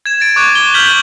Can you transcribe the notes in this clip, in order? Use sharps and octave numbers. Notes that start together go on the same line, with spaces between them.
G#6 E7
G#6 A6 D7
C#6 D6 F#6 G#6 D#7
G7
F6 G6 A6 B6 F#7